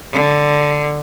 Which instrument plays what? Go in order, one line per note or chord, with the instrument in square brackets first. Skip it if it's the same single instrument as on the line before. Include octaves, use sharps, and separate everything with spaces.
[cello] D3